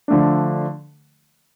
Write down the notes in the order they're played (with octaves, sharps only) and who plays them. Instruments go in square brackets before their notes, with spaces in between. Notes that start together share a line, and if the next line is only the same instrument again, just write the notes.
[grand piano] D3 F3 A3 D4